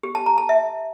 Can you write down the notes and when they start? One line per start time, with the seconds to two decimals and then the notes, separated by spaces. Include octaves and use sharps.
0.03 G4
0.15 A5
0.26 A#5
0.38 A5
0.49 E5